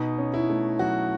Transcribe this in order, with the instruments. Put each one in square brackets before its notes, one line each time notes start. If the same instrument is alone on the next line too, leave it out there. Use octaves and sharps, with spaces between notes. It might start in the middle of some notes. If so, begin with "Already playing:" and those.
Already playing: [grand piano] B2 D#4
C#4
E4
A3
F#3 F#4